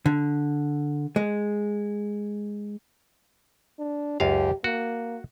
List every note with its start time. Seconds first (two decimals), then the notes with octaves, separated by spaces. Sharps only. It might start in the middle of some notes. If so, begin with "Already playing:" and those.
0.06 D3
1.16 G#3
3.79 D4
4.20 C#2 F#2 G4 F5
4.64 A#3 F#4